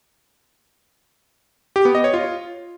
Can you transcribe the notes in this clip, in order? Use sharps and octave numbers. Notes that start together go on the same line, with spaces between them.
G4
B3
D#5
C#5
F4